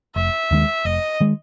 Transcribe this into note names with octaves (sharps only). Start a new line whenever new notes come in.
F1 E5
D#2 D#3 G#3
F1 D#5
D#3 G#3